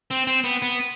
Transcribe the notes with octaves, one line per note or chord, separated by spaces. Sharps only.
C4
C4
B3
B3